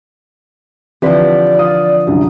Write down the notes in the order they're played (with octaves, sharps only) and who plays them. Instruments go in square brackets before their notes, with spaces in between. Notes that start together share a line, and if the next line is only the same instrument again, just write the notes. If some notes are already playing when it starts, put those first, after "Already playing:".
[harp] D3 F3 [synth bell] E3 C4 B4 [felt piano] G4 [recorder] D5
[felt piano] F5 D#6
C2 F#2 D3